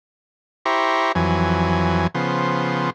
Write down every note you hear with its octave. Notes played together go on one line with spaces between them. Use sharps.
E4 G4 C5 A#5 C#6
F2 E3 F#3 G#5
C#3 F3 B3 C5